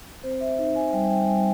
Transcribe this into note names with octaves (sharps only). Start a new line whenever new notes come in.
C4 C5
E5
D#4 E5
G#5
G3 G5
G5
G3 G#5